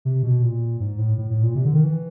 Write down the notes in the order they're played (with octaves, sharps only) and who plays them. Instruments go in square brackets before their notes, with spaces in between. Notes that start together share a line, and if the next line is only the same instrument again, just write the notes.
[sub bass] C3
B2
A#2
G#2
A2
A2
A2
A#2
C3
D3
D#3
E3